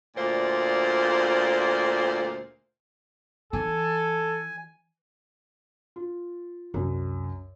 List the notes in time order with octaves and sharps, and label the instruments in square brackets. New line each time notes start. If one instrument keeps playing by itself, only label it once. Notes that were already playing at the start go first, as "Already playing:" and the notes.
[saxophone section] D2 A#2 F4 C5
[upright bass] E3 [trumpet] A4 [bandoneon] G#5
[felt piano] F4
[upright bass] C2 [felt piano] F#2